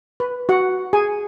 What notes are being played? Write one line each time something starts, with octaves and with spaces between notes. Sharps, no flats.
B4
F#4 F#5
G#4 G#5